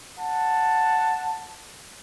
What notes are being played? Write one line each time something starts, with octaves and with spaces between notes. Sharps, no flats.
F#5 A5